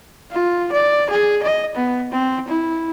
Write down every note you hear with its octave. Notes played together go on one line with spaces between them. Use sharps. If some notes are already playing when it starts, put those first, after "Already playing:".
F4
D5
G#4
D#5
B3
C4
E4